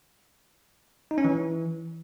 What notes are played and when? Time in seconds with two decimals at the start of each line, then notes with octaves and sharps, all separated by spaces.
1.11 D#4
1.18 C#4
1.25 E3